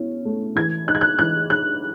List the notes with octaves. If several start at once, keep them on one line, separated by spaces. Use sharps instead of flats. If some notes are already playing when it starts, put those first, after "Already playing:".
Already playing: B2 C#4 E4
A3
E3 G#6
D#4 F#6
G#6
F#6
E3 F#6
D#4 F#6